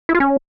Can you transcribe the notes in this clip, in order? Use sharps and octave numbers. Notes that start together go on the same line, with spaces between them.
E4
F4
C#4